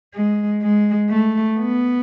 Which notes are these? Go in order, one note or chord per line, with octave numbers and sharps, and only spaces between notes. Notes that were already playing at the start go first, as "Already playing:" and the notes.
G#3
G#3
A3
B3